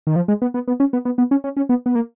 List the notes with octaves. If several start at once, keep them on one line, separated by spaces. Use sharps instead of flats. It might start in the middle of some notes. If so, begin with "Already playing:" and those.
D#3
F3
G#3
B3
B3
B3
C#4
B3
B3
B3
C#4
C#4
C#4
B3
B3
A#3